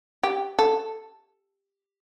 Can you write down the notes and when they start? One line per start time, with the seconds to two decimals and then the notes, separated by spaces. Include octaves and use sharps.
0.23 G4
0.59 A4